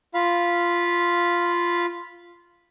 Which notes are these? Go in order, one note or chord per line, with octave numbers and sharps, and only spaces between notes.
F4 F5 B5